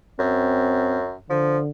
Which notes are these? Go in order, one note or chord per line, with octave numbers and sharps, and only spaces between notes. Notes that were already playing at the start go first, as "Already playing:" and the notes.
F#2 C4
D3 F3